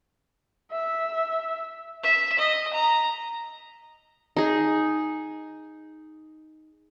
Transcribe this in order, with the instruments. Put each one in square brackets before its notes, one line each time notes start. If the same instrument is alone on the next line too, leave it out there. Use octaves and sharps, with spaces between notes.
[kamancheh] E5
[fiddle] E5
D#5
A#5
[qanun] D#4 G#4